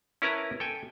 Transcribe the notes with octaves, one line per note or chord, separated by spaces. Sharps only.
C#4 E4 A#4 B4 A5 A#5
A4 G5 G#5